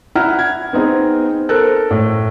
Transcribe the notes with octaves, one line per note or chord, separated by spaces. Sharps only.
E4 F#5 A#5 F6
G#6
B3 C4 D#4 G#4
A4 A#4 C5 A5 F#6
A2